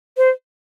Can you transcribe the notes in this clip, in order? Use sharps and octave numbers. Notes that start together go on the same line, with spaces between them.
C5